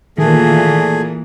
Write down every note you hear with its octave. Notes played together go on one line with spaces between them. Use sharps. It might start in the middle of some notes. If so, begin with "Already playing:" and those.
A#2 D#3 E3 A3 A#3 G#4